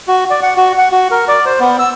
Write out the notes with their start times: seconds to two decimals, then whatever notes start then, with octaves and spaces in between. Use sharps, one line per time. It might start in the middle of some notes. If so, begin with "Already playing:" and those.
0.08 F#4
0.30 D5
0.43 F#5
0.57 F#4
0.78 F#5
0.92 F#4
1.11 A#4
1.28 D5
1.45 C5
1.60 B3
1.79 E6